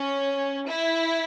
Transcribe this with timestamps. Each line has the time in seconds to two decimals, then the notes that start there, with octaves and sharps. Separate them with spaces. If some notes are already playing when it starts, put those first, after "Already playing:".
Already playing: C#4
0.67 E4